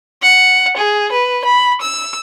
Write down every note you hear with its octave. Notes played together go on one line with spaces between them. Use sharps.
F#5
G#4
B4
B5
E6